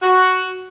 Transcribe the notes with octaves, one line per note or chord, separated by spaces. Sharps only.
F#4